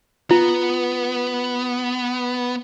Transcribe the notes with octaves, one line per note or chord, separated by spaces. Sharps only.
B3 F4